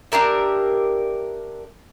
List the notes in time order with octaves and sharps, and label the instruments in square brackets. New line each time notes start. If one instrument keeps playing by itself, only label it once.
[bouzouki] D4 G4 A#4 E5